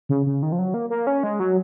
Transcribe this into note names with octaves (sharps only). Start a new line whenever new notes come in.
C#3
C#3
D#3
F3
F#3
A#3
A#3
C#4
G#3
F#3